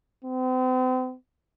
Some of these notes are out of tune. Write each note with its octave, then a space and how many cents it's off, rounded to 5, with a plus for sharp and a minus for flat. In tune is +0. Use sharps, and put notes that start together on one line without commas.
C4 -40